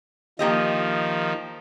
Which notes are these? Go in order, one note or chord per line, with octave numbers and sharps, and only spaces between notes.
D#3 F3 A#3 G4 D#5